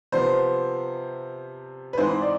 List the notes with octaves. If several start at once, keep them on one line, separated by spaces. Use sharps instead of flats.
C3 F3 B3 C5
B4
G#2 E3 G#3 C4 C5
D5